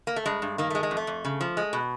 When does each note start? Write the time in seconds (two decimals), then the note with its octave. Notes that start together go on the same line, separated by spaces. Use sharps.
0.07 A#3
0.16 A3
0.26 G2 G#3
0.42 G2
0.58 D#3 A#3
0.70 G#3 A3
0.83 G#3
0.91 F2
0.97 A3
1.07 F2
1.25 C#3
1.41 F3
1.57 G#3
1.73 B2